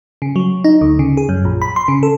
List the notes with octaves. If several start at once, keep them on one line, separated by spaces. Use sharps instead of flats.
C#3
F#3
D#4
D2
C#3
G#4
F#2
A#1
B5
C6
C#3
A4